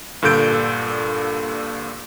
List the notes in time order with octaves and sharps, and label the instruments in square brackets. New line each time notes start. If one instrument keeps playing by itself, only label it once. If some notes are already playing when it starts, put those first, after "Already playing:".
[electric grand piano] G2 A#2 D3 A4 G6 D7